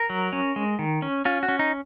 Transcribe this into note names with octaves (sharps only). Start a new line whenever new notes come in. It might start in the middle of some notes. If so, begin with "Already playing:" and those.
Already playing: A#4
F#3
C#4
G#3
D#3
C#4
C#4 F4
F#4
C#4
D#4